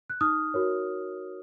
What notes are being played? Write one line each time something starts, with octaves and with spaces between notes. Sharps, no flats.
F#6
D#4 D#6 F6
F#4 A#4 C#5